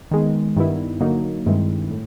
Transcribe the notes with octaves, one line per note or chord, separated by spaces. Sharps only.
D#3 G#3 B3
G2 D#3 G3 B3 E4
D3 F#3 A#3 D#4
G2 D#3 G#3 C4 E4
A2